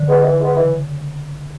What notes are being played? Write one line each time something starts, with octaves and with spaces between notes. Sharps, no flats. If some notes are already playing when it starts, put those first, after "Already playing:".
Already playing: D3
G#3 B3
E3
G#3 B3
C#3 E3